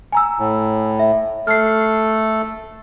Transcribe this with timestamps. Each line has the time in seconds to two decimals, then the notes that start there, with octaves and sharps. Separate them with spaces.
0.12 G#5 A#5 E6
0.39 A2
0.99 E5
1.47 A3 A4 F6 C7